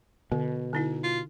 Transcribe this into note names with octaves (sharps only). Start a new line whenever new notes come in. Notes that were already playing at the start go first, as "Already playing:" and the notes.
B2 D3
D3 D#4 E4
F4